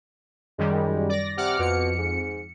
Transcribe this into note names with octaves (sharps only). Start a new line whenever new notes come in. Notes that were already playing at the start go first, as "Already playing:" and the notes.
F#2 D#3 G3 G#3
D5 A#6
C3 F#5 D6 F6
F2 B2 C#7
G#2